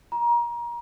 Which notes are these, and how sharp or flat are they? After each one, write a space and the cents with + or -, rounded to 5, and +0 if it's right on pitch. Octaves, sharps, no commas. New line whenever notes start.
A#5 +30